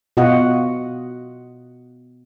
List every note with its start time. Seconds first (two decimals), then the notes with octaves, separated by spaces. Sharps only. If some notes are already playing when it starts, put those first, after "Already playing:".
0.17 B2 F4 F#4 D#5 F#5